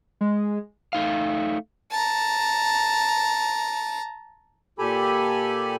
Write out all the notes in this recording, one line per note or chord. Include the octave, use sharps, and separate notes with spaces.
G#3
A3 D#4 F5
A5 A#5
A#2 G4 A4 G#5 B5